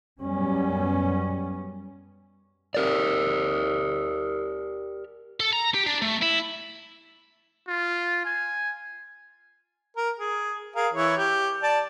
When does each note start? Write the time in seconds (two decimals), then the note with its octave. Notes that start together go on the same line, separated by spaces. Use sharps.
0.22 F#2 G3 B3 C#4
2.74 G4 A#4 D5
5.40 A4
5.53 A#5
5.74 G4
5.87 D4
6.02 A3
6.23 E4
7.68 F4
8.25 G#5
9.97 A#4
10.19 G#4
10.76 G#4 A#4 F5
10.94 E3 E4 C#5
11.17 G4
11.63 D5 A5